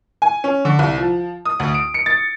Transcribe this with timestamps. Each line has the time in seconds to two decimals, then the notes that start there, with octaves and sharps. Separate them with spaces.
0.22 G#5
0.44 C#4
0.65 D3
0.79 C2
0.98 F3
1.45 D#6
1.60 D2
1.74 D7
1.94 C#7
2.06 A6